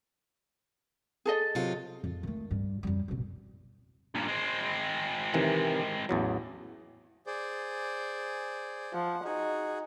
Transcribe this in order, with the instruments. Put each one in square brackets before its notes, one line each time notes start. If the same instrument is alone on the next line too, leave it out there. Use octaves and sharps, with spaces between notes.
[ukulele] G#4 A4 D#5
[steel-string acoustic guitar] C3 F#3 F4
[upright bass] F2
D#3 A3
G2
F#2 G3
A1 B2
[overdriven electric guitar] G2 A#2
G#3 C4
[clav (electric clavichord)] C3 D#3 E3
A1 E2 F#3
[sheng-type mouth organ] G#4 C5 D5
[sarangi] F3 [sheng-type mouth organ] F#5
[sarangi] D#4 [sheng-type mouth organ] F#4 G#4